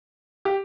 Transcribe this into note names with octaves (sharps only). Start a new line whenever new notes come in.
G4